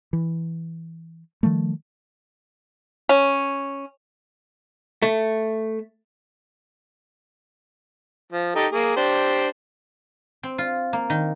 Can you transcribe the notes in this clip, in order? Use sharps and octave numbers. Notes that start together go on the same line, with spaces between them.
E3
D#3 F3 G3 A3
C#4
A3
F3
D#4 G4 A4
A#3 G#4
D4 G4 C5
C4
F4
A#3
D#3